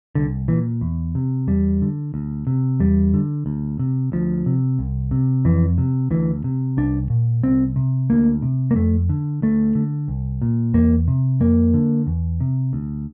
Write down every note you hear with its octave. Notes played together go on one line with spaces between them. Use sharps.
C2 D3
A#2 E3
E2
C3
E2 G3
D3
D2
C3
E2 G3
D3
D2
C3
D2 F3
C3
C2
C3
F2 E3
C3
D2 E3
C3
C2 D4
A#2
C2 C4
C3
D2 A#3
C3
A#3
F2 A3
D3
D2 A3
D3
C2
A#2
E2 A#3
C3
F2 A#3
D3
E2
C3
D2